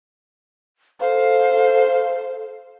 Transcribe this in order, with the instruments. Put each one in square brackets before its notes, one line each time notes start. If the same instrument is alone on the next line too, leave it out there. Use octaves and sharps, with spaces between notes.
[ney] A4 [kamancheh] C5 [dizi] F5